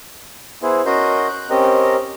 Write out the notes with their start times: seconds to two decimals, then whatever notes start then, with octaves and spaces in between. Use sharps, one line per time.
0.63 B3 E4 G#4 C5
0.86 C#4 F#4 A#4 D#5 C6 G6
1.28 F#6 G6
1.50 C4 C#4 G4 A#4 D#5